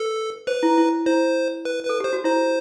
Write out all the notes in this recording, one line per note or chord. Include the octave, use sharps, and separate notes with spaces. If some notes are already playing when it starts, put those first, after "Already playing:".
Already playing: A4 B4
B4 C5
E4
E4
E4 C5
B4
A4 B4
G4 C5
F#4
E4 C5